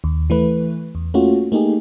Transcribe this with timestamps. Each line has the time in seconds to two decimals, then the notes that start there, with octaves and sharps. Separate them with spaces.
0.04 D#2
0.30 E3 A3 B4
0.95 E2
1.14 A3 A#3 C#4 F4 F#4
1.52 A3 A#3 D#4 G4 G#4